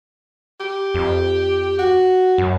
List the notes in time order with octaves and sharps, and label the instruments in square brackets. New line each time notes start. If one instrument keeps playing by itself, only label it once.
[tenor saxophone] G4
[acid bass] F2
[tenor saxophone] F#4
[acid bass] F#2